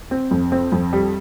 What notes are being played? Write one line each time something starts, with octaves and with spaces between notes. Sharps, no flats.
C4
F2
C4
F2
G3